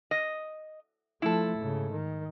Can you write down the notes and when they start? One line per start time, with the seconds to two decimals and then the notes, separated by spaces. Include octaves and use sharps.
0.11 D#5
1.22 F3 A3 E4 A4
1.57 G#2 C#3
1.91 D#3